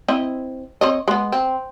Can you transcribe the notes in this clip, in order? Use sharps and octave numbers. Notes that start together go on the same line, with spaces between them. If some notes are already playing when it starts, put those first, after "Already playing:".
C4 E4 D#5
C4 C#5 D#5
G#3 B3
C4